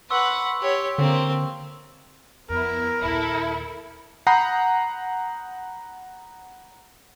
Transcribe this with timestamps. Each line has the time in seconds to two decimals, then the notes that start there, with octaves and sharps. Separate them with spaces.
0.10 B4 F#5 C6 C#6 E6
0.61 G4 C#5
0.98 D3 A#3 C4
2.49 F2 B3 E4 A#4
3.01 A#1 D#2 E4 A4
4.27 F#5 A#5 B5 D#6 G6 C7